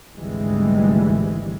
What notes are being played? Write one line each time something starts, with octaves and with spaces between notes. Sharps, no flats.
G#1 D2 C3 E3 G3 G#3